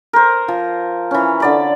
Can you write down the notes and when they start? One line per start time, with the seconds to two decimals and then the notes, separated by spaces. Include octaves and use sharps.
0.13 A#4 C5
0.48 F3
1.11 E3 C#4
1.40 D3 D5 B5